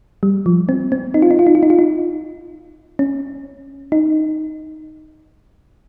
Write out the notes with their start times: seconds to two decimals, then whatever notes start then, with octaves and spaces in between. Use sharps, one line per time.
0.23 G3
0.46 F3
0.69 C4
0.92 C4
1.14 D#4
1.22 F4
1.31 D#4
1.39 F4
1.47 D#4
1.55 F4
1.63 D#4
1.70 F4
1.79 D#4
2.99 C#4
3.92 D#4